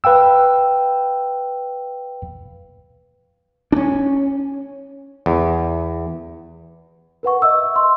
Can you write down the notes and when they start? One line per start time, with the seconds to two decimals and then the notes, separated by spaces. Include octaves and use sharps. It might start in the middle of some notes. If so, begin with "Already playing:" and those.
0.04 B4 F5 G5 E6
3.72 C#4 D4
5.26 E2
7.23 A#4 B4 F#5 C#6
7.42 D#5 E5 E6
7.76 C6